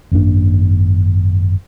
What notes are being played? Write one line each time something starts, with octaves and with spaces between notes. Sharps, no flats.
G#1 F#2 A#3 D4